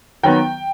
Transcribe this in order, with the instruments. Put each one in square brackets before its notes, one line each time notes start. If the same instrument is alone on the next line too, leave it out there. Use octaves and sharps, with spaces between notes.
[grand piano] D#3 F#3 B3 G5